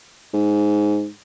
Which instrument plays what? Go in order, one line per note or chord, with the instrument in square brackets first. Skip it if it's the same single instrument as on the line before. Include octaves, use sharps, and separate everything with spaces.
[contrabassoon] G#2